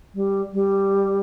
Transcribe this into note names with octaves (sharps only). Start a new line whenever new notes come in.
G3
G3